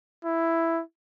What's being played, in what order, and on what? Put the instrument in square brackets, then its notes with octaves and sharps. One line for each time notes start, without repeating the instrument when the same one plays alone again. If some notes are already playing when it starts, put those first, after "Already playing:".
[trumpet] E4